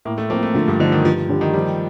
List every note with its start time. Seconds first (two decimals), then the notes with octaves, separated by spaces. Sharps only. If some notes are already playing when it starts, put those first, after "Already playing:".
0.05 A2 A#3
0.18 A3
0.30 F3 A3 A#3 C4
0.43 A3
0.55 D3 F3
0.68 G2
0.79 D3 F3 A#3 D#4
0.92 D#3
1.05 G2 F3
1.29 D3 G3
1.41 D#3
1.53 F3 G3